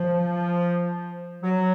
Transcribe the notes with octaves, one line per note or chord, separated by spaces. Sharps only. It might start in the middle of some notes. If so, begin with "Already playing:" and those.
Already playing: F3
F#3